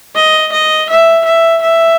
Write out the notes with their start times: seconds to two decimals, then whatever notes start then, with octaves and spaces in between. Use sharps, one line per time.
0.16 D#5
0.52 D#5
0.90 E5
1.25 E5
1.62 E5